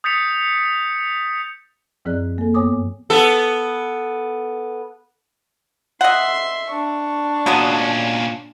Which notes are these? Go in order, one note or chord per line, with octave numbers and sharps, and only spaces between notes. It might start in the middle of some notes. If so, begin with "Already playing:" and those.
D#6 G6 A6 B6 C#7 F7
F#2 F3 C4 G#4 D5 F#6
A#3 A4
G2 B3 C#5 G#5 D6 D#6
B3 A4
D#5 E5 F#5 C6
D4 C#6
A#2 F#3 G#3 B3 C#4